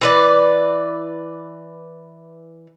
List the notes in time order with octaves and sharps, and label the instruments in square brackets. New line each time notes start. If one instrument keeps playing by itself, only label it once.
[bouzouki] E3 B4 D5